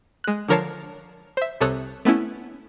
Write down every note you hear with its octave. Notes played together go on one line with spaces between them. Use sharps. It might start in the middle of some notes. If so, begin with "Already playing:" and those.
G#3 F#6
D3 F3 A#4 C#5 A5 C7
C5 E5
C2 C3 A4 C#5 D#6 F#6
A3 B3 C#4 E4